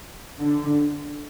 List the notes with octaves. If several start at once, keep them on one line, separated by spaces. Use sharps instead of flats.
D3